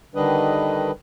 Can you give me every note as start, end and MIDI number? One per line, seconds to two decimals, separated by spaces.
0.15 0.91 50
0.15 0.91 51
0.15 0.91 55
0.15 0.91 62
0.15 0.91 71
0.15 0.91 75